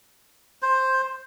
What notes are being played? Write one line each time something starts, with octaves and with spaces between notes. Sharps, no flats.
C5